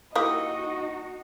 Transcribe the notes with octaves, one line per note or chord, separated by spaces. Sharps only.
A#3 D#4 E4 F#4 G4 D#5 D#6